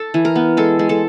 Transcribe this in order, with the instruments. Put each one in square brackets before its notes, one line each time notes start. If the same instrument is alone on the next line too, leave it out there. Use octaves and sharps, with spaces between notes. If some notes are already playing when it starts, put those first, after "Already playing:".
Already playing: [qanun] A4
E3
A#4
B3
G#3 A4
G#3
A4